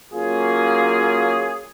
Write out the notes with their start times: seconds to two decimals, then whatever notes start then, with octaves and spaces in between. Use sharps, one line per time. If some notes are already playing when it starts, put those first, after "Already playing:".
0.12 F#3 A#3 C#4 F4 G#4